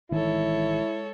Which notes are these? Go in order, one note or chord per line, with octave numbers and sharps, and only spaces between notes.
A1 D#3 E3 G#3 E4 A4 C#5